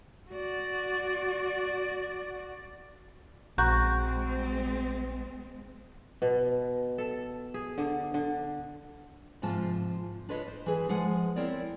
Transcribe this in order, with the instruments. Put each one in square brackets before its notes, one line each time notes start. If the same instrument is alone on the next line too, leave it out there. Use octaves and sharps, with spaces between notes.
[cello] F#4 D5
[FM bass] A#1 [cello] G#3 C4 [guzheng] F#4 [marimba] A#5 G6
[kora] B2
A4
G#4
D3
D3
[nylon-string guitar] G#2 C3 F3 F4 A5
D4 F4 B4 C#5 D#5
C5
E3 G#4
F3 G#3 G#4 F#5
C4 E4 A#4 C#5 D5